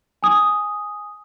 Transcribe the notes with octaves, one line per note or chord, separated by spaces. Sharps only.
G#5 D#6